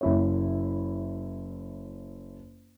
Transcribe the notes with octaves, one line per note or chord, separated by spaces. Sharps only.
F#1 E4 C#5